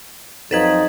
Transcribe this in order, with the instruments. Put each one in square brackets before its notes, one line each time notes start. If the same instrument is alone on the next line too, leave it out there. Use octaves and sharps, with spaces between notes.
[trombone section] F2 F#3 D#4 [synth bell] A4 B4 G#6